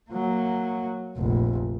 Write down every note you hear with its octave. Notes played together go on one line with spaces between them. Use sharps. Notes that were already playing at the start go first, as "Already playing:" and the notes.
F#3 A#3
F1 A#1